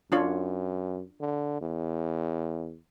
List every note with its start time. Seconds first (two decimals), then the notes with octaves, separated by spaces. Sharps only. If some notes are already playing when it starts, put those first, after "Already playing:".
0.12 F#2 D4 F4 C#5
1.20 D3
1.61 E2